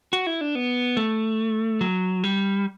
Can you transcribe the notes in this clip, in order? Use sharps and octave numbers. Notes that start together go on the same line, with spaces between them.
F#4
E4
D4
B3
A3
F#3
G3